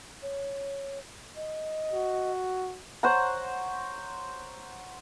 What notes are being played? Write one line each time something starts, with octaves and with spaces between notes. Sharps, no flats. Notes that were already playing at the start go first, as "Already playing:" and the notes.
C#5
D#5
F#4
C5 C#5 F#5 A#5